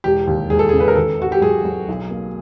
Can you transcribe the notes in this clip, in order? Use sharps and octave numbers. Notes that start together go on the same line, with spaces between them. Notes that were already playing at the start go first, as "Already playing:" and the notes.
E1 G4
D#2
E1 G#4
A4
C#3 G#4
B4
A#4
D#3 A4
G#1 F#4
G4
F#3 G#4
F#3
B1
A#3